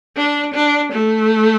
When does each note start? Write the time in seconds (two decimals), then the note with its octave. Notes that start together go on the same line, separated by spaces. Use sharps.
0.17 D4
0.54 D4
0.92 A3